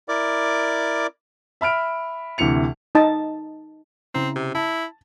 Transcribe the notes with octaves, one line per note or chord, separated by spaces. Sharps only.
E4 A#4 D5 D6
E5 B5 F6 D7
D2 C3 E3 C#7 F7
D#4 D#5 A5
C#3 C4 E4 A#5
C3
E4 A5